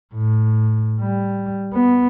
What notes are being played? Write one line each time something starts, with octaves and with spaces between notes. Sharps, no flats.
A2
G3
B3